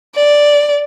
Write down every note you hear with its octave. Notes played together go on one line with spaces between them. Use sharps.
D5